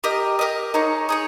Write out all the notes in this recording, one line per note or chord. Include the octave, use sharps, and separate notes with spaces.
G4 A#4 D#5
G4 A#4 D#5
D#4 G#4 C#5
D#4 G#4 C#5